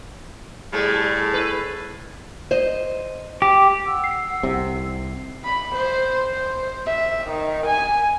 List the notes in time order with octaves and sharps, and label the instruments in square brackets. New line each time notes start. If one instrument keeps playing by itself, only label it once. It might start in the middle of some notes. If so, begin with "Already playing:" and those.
[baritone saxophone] A2 [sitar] G3 A3 G#4
[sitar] E4 B4
[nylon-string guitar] C5 D#5
[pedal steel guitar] G4
[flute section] F#5 E6
[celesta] C7
[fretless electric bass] C2 C3
[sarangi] B5
C5
C5
E5
D#3
G#5